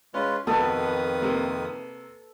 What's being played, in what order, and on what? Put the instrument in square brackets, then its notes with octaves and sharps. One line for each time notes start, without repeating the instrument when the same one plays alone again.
[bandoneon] G#3 F4 B4 [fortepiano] C#4
[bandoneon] F2 D#3 D#6 [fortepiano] B2 [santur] A4 [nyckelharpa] B4
[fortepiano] C3 A#3